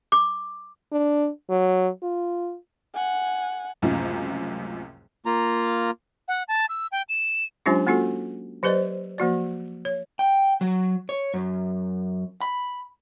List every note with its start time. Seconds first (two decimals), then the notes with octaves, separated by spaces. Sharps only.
0.12 D6
0.92 D4
1.50 F#3
2.03 F4
2.94 F#5 G#5
3.82 F#1 C#2 F#2 A2 C3 F3
5.26 A#3 F4 A#5
6.28 F#5
6.48 A5
6.69 E6
6.92 G5
7.09 E7
7.66 F#3 G#3 C#4 D4 F4 G4
7.87 A#3 C#4 F4 F#4 A4
8.63 F#3 G4 B4 C5 D5 D#5
9.18 F3 A#3 F#4 D5
9.85 C#5
10.19 G5
10.61 F#3
11.09 C#5
11.34 F#2
12.41 B5